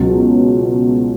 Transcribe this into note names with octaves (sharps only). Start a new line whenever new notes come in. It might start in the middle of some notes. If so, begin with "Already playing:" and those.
Already playing: C#2 B2 F#3